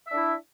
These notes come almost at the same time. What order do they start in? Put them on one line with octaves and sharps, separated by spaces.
E5 D4 E4